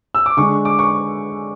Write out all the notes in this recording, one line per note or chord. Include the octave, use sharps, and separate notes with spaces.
E6
D6
D3 G#3 D4 C#6
D6
C#6